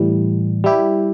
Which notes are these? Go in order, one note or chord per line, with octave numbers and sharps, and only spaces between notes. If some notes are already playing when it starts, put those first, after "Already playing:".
Already playing: A2 E3 G3
G3 E4 G4